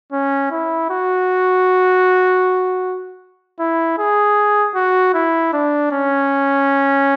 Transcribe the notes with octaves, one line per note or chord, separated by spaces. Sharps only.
C#4
E4
F#4
E4
G#4
F#4
E4
D4
C#4